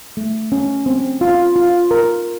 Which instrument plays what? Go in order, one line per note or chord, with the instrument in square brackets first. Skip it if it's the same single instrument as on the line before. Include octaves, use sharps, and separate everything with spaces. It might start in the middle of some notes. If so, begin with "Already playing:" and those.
[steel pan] A3
C#4
C4
F4
F4
A#4